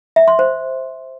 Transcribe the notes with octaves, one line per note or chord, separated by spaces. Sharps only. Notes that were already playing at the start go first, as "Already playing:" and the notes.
E5
C6
C5